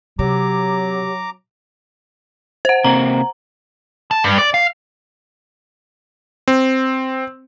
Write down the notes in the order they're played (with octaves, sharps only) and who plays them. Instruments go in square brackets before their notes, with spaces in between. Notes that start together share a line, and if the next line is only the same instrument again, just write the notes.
[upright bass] C3 [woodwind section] F#3 [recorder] G4 [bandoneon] A#5 D6
[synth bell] C5 F#5
[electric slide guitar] C3 A#3 C4 [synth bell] A#5
[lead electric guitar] A5
G2
D5
F5
[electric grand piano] C4